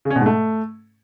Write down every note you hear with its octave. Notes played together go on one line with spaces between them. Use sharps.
C#3
C#4
B2
G#2
A3